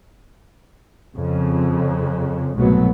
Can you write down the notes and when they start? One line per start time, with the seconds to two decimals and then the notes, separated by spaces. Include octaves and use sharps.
1.13 F2 C#3
2.54 C2 G#2 B2 F#3 A3 B3